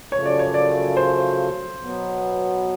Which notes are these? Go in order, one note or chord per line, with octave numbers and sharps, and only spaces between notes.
F#2 C#3 F3 A3 C#5
D5
C#5
D5
C5
B2 F#3 B3